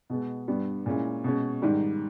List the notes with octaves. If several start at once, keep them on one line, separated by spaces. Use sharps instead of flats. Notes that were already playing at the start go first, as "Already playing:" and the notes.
B2 G#3 B3
G2 G3 B3
A#2 G#3 C#4 E4
B2 G#3 C#4
G#2 D#3 G3